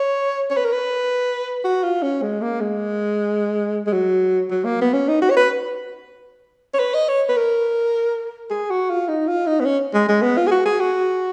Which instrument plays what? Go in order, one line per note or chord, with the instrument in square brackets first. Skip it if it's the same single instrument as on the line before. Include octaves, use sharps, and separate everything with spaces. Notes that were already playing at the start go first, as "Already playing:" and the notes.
Already playing: [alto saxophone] C#5
C#5
B4
A#4
B4
F#4
F4
C#4
G#3
A#3
G#3
G#3
F#3
F#3
A#3
B3
C#4
D#4
F#4
C#5
B4
C#5
B4
D#5
C#5
B4
A#4
G#4
F#4
F4
D#4
F4
D#4
B3
C#4
G#3
G#3
B3
F4
G#4
F#4
G#4
F#4